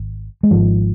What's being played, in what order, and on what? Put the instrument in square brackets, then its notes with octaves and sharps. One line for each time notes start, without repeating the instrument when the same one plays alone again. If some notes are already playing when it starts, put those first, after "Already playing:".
Already playing: [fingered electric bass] G#1
G#3
G#1 G#2 F3